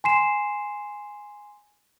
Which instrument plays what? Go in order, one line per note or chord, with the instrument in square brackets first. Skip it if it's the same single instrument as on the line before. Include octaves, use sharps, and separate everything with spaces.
[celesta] G#5 C6 C7 E7